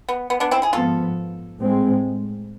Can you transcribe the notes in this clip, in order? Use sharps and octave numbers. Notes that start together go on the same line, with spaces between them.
B3
B3
B3 D4
C4 E4
E4 G#4
G#2 F3 B3 F4 A4
A2 G#3 C4